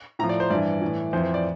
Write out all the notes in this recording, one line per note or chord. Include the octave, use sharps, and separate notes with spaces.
A2 F3 A#5
D5
C5
G2 E3 D5
A2 E3
F2 E3 C5
C5
D5